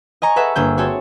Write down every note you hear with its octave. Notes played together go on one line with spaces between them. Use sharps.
D#5 G#5 A#5 C#6
G#4 A4 B4 E5 F#5
G1 A#3 G#4 E6 G6
C4 F#4 G#4 A4 C#5